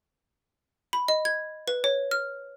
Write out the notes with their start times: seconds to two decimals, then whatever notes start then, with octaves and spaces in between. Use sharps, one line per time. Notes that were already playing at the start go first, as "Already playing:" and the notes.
0.93 B5
1.08 D#5
1.25 G#6
1.68 B4
1.84 C#5
2.11 F6